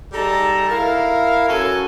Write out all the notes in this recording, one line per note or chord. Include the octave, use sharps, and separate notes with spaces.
G3 D#4 G#4 A4 A5 A#5
E4 A#4 F5
F#2 C#4 F#4 A4 G#5